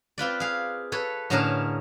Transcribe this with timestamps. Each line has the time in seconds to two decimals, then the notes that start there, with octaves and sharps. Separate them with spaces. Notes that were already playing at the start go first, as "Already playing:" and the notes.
0.18 C4 F4 B4 D5
0.40 G#4 F5
0.92 A4 B4 C#5
1.30 A2 D3 C#4 G#4 A#4 A5